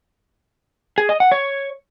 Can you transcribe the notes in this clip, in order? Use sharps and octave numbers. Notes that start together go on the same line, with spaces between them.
G#4
D#5
F#5
C#5